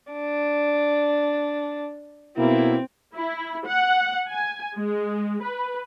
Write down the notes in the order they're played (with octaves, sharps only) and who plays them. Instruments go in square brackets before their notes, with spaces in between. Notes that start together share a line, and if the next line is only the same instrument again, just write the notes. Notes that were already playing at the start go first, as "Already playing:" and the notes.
[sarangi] D4
[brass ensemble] B2 A#3 E4 [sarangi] C4
[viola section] E4
F#5
G#5
G#3
B4